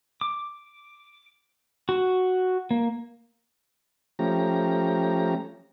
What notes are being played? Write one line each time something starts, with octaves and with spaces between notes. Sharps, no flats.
D6
F#4
A#3
F3 A3 C#4 G4 A#5